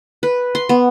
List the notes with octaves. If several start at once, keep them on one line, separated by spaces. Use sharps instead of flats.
B4
C6
B3